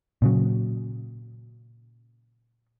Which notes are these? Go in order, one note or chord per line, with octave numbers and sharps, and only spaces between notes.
A#2 C#3 F#3